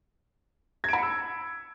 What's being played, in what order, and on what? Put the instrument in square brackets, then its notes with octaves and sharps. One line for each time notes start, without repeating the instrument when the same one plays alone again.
[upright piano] G#6
D7
B5
C#7
E6